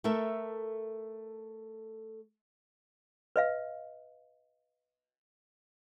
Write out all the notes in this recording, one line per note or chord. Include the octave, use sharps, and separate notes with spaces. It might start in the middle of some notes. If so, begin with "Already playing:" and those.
A3 A4 A#4 E5
B4 D#5 F5